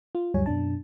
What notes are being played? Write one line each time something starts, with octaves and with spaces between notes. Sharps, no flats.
F4
D2 G2 F#3 G3 C#5 G#5
F#2 B2 D4 A5